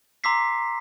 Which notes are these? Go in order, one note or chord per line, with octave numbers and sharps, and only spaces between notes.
A#5 C6 D6 E6 B6 C7